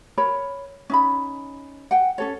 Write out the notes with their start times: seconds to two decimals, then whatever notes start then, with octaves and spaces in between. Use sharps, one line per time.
0.18 A#4 C#5 B5
0.90 C#4 D#4 B5
1.91 F#5 G5
2.18 C#4 A4 C#5